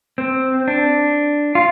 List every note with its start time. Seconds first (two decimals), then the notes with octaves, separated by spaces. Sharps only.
0.18 C4
0.68 D4
1.55 F4